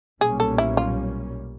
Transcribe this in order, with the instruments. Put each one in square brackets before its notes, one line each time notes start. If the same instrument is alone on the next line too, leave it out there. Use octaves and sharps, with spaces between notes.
[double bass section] B1 A#2 G3 A#3 C#4 [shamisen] G#4
[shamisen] A4
E4
F4